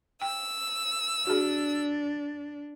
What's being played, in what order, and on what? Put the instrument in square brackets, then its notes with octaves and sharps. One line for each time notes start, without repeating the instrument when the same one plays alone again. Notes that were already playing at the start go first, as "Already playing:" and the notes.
[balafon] G5 [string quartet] E6
[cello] D4 [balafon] F#4 G#4